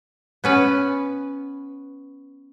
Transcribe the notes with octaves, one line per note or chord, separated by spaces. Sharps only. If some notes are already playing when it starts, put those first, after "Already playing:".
B3 C#4 B4